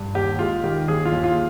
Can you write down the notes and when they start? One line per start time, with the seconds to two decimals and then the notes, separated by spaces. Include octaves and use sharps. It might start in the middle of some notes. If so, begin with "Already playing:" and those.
Already playing: G2
0.15 D#2 G4
0.39 G#3 F4
0.64 D#3 G4
0.88 D#2 G#4
1.05 F4
1.12 D#2
1.24 F4